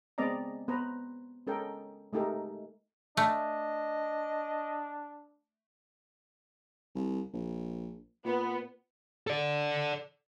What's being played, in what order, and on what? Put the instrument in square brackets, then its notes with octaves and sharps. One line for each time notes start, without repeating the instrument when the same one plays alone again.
[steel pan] G#3 B3 C4 D5 D#5 A#5
B3 B4 C5 A#5
G#3 C#4 A4 A#4 D#5 G5
G#3 A3 D#4 G4 A4 A#4
[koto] A3 [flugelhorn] D4 [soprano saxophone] D#5
[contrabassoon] C2
A#1
[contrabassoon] A#2 [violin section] B3
[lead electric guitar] A4 D5